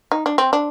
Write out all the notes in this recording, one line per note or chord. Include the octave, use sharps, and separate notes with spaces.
D#4
D4
C4
D4